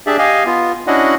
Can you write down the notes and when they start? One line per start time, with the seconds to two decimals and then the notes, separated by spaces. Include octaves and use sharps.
0.07 D4 G4 G#4 D5 E5
0.18 G4 D#5 F5 G#5
0.46 B3 F4
0.87 C#4 D4 E4 F#4 D#5 F#5